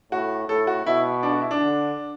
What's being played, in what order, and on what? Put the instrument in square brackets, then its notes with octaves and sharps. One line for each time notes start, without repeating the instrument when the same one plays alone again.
[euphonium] A2 [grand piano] F#4
[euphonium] A2 [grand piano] A4
[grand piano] F#4
[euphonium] B2 [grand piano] E4
[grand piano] D4
F#4
E4
D4
[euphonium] D3